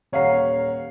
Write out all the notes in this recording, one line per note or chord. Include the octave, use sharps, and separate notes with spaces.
D#1 C#5 F5 F#5 A#5 C7